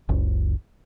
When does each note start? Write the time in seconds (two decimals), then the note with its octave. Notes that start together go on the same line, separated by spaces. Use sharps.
0.09 F#1 C#2